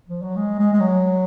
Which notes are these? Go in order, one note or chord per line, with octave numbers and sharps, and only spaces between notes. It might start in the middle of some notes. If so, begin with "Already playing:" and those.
F3
F#3
G#3
G#3
G#3
F#3